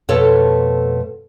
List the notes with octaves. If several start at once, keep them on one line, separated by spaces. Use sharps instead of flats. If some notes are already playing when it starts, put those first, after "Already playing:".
F2 B2 A3 A4 C#5